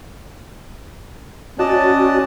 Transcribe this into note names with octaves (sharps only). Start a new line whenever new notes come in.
C#4 F#4 D5 D#5 A5